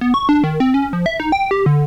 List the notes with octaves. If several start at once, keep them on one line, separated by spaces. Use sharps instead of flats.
B3
C#6
D4
D#3
C4
C#4
F3
E5
D#4
G5
G4
D3